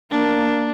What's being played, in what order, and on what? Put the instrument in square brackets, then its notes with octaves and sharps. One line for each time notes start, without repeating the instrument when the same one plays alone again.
[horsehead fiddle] A#3 [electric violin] D4